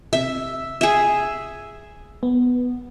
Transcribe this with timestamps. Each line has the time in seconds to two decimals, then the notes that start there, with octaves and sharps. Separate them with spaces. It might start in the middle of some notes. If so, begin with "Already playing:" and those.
0.13 C3 E5
0.81 G#4 E5
2.23 B3